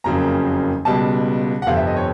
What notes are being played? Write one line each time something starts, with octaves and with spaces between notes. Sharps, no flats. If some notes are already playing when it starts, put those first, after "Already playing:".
F#1 F2 C#3 F#3 A#3 A#5
C#2 B2 G3 A5
F#5
G1 F2 C3 F5
E5
D#5
C#5